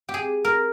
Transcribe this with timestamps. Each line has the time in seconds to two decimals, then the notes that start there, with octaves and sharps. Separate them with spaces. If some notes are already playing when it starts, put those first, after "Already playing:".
0.09 G4
0.14 G#4
0.45 A#4